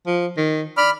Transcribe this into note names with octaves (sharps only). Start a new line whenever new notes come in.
F3
D#3
D5 B5 F6